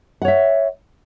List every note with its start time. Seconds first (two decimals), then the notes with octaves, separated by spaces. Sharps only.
0.22 F#5
0.25 C#5
0.28 E5